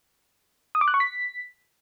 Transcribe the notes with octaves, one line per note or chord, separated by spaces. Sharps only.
D#6
D6
F#6
C#6
B6